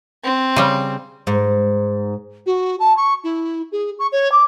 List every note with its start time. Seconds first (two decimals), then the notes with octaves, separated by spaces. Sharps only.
0.24 C4
0.56 C#3 G3
1.27 G#2
2.46 F#4
2.80 A5
2.97 C#6
3.24 E4
3.72 G#4
3.99 C#6
4.12 C#5
4.32 D6